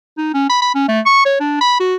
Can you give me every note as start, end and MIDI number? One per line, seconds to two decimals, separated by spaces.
0.18 0.33 63
0.34 0.46 61
0.50 0.59 83
0.62 0.73 83
0.75 0.85 61
0.89 1.01 57
1.06 1.22 85
1.25 1.38 73
1.40 1.59 62
1.60 1.75 83
1.80 1.96 66